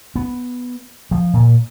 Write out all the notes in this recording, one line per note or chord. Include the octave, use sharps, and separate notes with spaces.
B3
F3
A#2